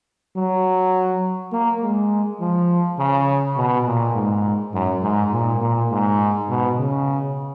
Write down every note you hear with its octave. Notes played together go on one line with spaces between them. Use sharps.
F#3
A#3
G#3
F3
C#3
B2
A#2
G#2
F#2
G#2
A#2
A#2
G#2
B2
C#3